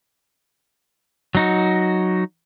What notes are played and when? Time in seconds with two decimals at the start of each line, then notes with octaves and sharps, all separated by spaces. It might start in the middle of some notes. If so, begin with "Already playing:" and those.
1.35 F#3 D#4 F#4